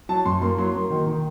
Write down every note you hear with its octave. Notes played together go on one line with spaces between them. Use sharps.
F#3 A5
F#2 C6
A#3 C6
F#3 C6
A#3
D#3
D#3